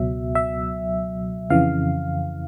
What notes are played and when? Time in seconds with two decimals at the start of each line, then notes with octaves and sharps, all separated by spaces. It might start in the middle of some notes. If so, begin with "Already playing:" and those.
Already playing: C#2 B2 F#3 E5
0.35 E5
1.50 F2 C#3 E3 F5